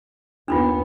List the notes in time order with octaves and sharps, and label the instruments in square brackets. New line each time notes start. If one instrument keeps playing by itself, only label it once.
[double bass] D#2 B3 [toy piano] D4 D#4 F4